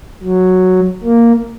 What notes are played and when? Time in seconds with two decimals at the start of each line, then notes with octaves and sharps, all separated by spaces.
0.23 F#3
1.04 A#3